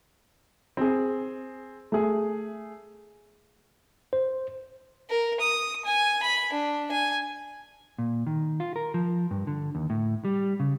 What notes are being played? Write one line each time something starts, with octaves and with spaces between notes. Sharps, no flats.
C4 G#4
A3 G#4
C5
A#4
D#6
G#5
B5
D4
G#5
A#2
D#3
F4
A#4
F3
G2
D3
D#2
A2
G3
C#3